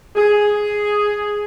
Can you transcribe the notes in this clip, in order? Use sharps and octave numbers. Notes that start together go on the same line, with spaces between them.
G#4